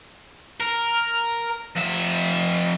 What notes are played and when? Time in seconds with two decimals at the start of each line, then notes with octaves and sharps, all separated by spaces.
0.60 A#4
1.76 F2 E5